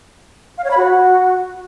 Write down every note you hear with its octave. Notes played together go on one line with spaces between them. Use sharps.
F5
C#5
B5
F#4